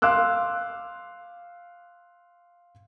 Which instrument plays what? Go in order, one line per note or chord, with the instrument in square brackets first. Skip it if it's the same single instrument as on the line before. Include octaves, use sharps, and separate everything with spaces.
[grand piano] F5 C6 D6 E6 F#6